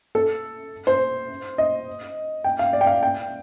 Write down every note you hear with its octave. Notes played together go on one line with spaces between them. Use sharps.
A4
C5
D#5
G5
F5
D5
G5
F5
G5